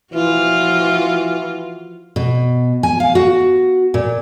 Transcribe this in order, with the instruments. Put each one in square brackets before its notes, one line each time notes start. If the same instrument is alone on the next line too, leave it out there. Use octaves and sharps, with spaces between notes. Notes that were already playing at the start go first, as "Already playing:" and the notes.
[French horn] E3 [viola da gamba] F3 F4 F#4
[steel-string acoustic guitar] B2
G#5
F5
F#4
A#2